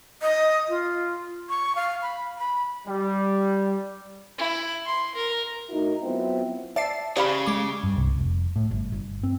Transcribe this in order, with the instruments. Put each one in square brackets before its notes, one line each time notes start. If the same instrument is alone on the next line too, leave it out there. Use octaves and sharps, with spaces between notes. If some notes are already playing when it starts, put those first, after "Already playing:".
[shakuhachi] D#5
F4
C#6
F5
B5
B5
[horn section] G3
[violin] E4
C6
A#4
[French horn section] A2 D#4 E4 F#4 A#4
F#3 B3 C4 E4 F4
[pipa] D5 [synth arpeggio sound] E5 A5 C7
[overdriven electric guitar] C#3 [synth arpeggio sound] G4 [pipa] D5 F5 B5
[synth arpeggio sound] G#3 D6
[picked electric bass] G2
C2
F1
A2
G1
G1
C4